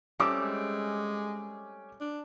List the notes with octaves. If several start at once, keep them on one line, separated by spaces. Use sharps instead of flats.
G3 A3 C4 C#4 D6 E6
G#3
D4